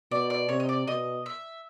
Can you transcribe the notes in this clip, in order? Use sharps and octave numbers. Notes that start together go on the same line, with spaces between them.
B2 D5
D5
C3 C#5
D#5
D5
B2 D#5
E5